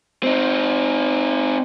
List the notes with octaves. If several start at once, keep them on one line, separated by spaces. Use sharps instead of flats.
C4 D#4